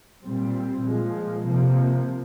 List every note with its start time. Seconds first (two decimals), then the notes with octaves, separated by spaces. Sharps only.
0.22 A#2 G3 C4
0.81 A#2 F3 G#3
1.42 C3 F3 A#3